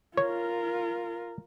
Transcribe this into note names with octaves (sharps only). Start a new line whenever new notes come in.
F4 A#4 C#5